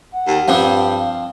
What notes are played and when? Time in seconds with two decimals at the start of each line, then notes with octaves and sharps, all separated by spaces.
0.13 F#5
0.27 D#2
0.48 G2 F3 C4 D4
0.99 F5